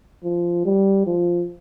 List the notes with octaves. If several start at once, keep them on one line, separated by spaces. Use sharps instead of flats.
F3
G3
F3